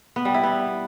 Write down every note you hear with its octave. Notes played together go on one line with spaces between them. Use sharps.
B3
G3
E4
B3